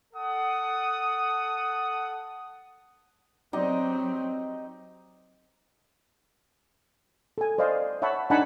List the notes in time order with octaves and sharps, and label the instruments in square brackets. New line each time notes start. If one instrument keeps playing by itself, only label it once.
[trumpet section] A4 F#5 D#6
[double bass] F#3 C4 [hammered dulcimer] D#4 G4 D#5
[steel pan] A4 G#5
C5 D5 D#5 F5 C6
C#5 E5 F#5 A5 B5
D4 D#4 F#5 G#5 A5 B5